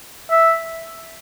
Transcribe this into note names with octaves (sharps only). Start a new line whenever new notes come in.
E5